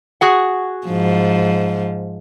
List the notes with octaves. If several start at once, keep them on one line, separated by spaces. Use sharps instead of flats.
F#4 G#4 F#5
G#2 F3